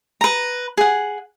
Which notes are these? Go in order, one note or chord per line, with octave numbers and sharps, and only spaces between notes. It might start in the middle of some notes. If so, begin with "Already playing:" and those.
B4 A#5
G#4 F#5